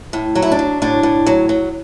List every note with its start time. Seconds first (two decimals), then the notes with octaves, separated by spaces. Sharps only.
0.13 A2
0.35 F#3
0.42 E4
0.52 D4
0.59 F#3
0.82 A2 D4
1.03 A2
1.26 F#3
1.49 F#3